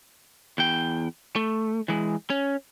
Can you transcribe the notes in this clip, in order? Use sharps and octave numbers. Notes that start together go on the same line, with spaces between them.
E2 G5
A3
E3 G#3
C#4